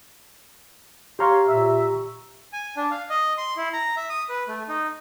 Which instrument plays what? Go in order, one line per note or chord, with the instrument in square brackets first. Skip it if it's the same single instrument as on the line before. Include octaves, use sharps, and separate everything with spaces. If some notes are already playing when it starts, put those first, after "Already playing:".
[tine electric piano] G4 A#5 C#6 [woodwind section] C#5 F5 C6
[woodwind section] A#2 E5
[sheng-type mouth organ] G#5
D4
F5
D#5
C6
E4
A#5
E5
D#6
B4
A3
D#4